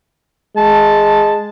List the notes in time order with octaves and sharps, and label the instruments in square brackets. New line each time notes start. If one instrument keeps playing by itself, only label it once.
[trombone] G#3 [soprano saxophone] A5